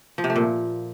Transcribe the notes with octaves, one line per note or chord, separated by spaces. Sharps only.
F3
C3
A3
A#2